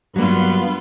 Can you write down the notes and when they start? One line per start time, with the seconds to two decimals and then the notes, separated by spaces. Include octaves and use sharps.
0.16 G2 F#3 A#3 B3 F4